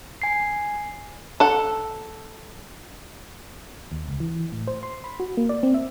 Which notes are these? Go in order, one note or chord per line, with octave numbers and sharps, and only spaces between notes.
G#5 C7
A4 F#5
D#2
C#2
E3
A2
C5
C6
B5
F#4
A#3
D5
C4
E5